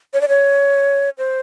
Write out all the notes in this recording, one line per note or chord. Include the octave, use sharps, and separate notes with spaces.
C#5
D5
C#5
C5